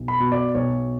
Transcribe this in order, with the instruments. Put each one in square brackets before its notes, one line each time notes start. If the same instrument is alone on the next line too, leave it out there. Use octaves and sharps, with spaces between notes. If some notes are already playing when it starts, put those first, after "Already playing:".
Already playing: [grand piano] B1
B5
B2
D5
B1 C#5